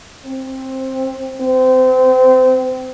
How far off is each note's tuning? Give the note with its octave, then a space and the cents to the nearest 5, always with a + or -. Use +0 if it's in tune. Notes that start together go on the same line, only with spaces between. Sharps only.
C4 +15
C4 -25